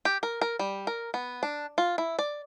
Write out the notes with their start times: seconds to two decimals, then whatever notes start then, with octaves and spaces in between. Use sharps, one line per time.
0.05 G4
0.23 A#4
0.41 A#4
0.59 G3
0.87 A#4
1.14 B3
1.43 D4
1.78 F4
1.98 E4
2.19 D5